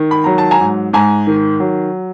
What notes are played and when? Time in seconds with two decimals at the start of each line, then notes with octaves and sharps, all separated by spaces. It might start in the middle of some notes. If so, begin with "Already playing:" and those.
Already playing: D#3
0.11 B5
0.24 F#3 A#5
0.38 A5
0.51 G#5 A#5
0.60 G#2
0.93 G#2 G#5 A#5
1.27 D#3
1.60 F#3